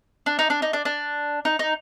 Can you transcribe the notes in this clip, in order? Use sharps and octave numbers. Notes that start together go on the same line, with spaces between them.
D4
D#4
D4
D#4
D4
D4
D#4
D#4